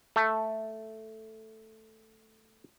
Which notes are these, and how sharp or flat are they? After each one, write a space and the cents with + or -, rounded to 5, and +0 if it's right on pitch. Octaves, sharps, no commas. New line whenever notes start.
A3 +0 A4 +0